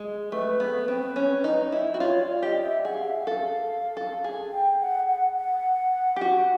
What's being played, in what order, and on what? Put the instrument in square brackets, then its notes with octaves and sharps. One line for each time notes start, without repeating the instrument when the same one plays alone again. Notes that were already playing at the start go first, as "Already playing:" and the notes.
Already playing: [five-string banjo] G#3
[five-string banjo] A3 [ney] B4
[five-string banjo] B3
C4
C#4
D#4
E4
F#4
[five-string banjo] F4 [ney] C#5
[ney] D5
D5
[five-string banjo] G4 [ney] D#5
[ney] E5
[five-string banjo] G#4 [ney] F#5
[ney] F5
E5
F5
[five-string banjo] A4
A4
G#4
[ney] G5
F#5
F#5
F#5
[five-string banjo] G4
F#4